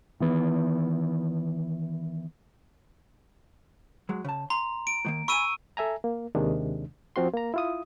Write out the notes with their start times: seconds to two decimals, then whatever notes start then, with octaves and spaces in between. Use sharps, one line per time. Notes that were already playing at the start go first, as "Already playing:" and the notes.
0.20 D#3 E3 B3
4.09 F#3 G#3
4.25 C#3 A5
4.50 A#5 C6
4.87 D7
5.05 A2 D#3 A#3
5.28 G#5 A5 B5 C#6 E6 D#7
5.77 A4 E5 G#5 A#5
6.04 A#3
6.35 D#2 C3 D#3 G#3 D4
7.16 F3 C4 F#4 C6
7.34 A#3 A#5
7.54 E4 F4 D#6